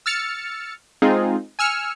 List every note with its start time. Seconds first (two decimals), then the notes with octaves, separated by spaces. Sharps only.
0.06 E6 F6 A6 C#7
1.02 G#3 C4 D#4 F4 G#4
1.59 G#5 E6 F6 C#7